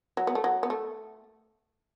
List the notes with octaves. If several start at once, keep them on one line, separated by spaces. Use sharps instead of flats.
F#3
B3
A3
F#3
B3
A3